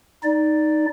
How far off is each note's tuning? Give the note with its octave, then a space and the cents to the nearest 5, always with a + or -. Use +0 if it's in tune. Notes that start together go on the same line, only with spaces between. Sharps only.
D#4 +0 D5 +0